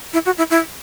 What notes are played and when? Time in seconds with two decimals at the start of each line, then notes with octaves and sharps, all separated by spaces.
0.13 E4
0.26 F#4
0.38 E4
0.50 E4